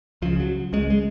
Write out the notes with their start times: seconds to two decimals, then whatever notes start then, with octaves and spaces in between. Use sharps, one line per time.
0.22 C#2 C#3 F3
0.40 F#3
0.73 C#2 C#3 G#3
0.90 G#3